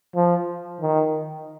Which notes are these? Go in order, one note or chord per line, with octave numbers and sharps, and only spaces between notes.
F3
D#3